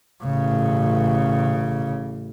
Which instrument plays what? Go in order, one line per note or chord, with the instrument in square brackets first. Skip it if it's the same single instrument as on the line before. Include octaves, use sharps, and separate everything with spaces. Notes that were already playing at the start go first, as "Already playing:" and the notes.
[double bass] A1 C#3